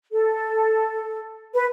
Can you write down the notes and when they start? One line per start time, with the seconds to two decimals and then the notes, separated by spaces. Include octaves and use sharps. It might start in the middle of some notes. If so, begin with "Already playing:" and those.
0.12 A4
1.55 B4